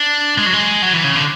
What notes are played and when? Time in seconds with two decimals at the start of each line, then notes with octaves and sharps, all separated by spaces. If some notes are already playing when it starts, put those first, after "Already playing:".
Already playing: D4
0.38 G#3
0.46 F#3
0.53 G#3
0.82 F#3
0.93 E3
1.04 C#3
1.16 D3